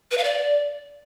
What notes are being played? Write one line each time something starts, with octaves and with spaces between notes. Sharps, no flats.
B4
F5
D5